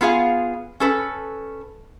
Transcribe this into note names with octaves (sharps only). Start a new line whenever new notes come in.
B3 F4 G#4 F5
C#4 A4 B4